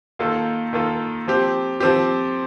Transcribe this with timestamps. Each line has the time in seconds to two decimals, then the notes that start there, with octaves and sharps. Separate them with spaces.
0.19 D#3 A#3 F4 A4
0.73 D#3 A#3 F4 A4
1.27 F3 C4 G4
1.80 F3 C4 G4